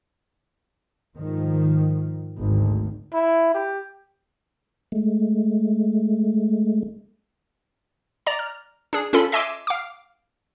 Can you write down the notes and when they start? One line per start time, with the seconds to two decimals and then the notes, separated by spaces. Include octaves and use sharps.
1.16 G#2 D#3 F3
2.37 G#1 D2
3.14 E4
3.54 G4
4.92 G#3 A3
8.26 D5 A#5
8.39 F6
8.93 D4 G#4
9.13 C#4 F4 A4 B5
9.32 D#5 E5 G#5 C6 D6 E6
9.67 F5 D6